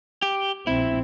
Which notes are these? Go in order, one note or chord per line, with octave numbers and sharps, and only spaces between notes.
G4
A#1 C4 E4